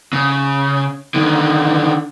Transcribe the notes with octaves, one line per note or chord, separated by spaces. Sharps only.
C#3
D3 D#3